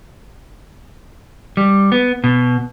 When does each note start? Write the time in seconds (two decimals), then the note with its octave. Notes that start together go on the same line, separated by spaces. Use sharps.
1.57 G3
1.92 B3
2.24 B2